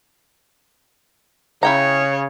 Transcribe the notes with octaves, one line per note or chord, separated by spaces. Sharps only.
C#3 E4 C#5 G5 A#5